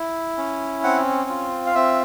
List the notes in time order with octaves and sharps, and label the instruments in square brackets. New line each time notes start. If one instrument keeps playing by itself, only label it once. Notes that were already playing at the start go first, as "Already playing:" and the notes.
Already playing: [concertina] E4
C#4
C4 F#5
F4
F5
C4 E5